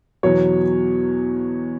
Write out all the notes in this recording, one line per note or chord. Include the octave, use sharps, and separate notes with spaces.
E2 B2 F#3 C#5